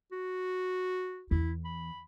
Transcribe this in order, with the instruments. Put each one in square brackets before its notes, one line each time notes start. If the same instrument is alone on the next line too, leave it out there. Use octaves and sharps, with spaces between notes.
[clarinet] F#4
[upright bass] E2 [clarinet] E4
[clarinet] B5